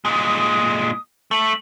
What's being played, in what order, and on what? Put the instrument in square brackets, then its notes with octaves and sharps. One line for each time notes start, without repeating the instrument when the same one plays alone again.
[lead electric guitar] A#2 G#3 [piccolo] D#6
[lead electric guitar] A3 [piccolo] F#7